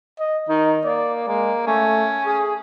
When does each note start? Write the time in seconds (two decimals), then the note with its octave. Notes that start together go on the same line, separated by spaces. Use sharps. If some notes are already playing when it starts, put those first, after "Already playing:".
0.19 D#5
0.49 D#3 D#4
0.84 A#3 D5
1.28 G#3 A#3
1.67 A3 C#4
2.26 G#4